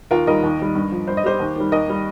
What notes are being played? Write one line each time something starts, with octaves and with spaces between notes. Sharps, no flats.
D#2 F4 A#4
D#3 G3 A#4 D#5
D#2
D#3 G3
G2
F3
G2 C5
D#5
G3 G4 C5
D#2
D#3 G3
D#2 A#4 D#5
D#3 G3